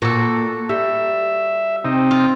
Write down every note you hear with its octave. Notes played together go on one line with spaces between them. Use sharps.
A#2 F#4 A4
G3 E5
C3 C4 D#4
F4